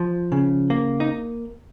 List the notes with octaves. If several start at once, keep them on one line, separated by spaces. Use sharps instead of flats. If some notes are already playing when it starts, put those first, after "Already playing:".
Already playing: F3
C#3
A#3
D#4